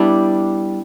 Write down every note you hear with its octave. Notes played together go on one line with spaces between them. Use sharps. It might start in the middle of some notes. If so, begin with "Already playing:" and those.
Already playing: G3 B3 D4 E4